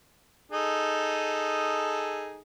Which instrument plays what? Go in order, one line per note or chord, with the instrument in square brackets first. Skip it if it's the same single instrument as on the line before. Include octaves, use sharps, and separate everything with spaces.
[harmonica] D#4 G#4 A4